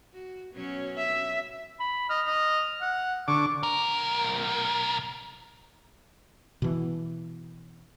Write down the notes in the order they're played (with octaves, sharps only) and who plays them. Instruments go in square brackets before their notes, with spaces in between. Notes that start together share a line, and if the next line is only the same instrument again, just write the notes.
[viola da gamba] F#4
B2 F#3 C#4
[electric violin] E5
[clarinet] B5
[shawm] D#5 [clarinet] F6
[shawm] D#5
F#5
[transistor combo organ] D3 D6 [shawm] C#6
[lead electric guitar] B1 A#4
[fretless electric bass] B2 E3